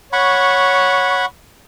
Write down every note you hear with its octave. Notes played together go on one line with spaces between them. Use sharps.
C#5 F#5 B5 C#6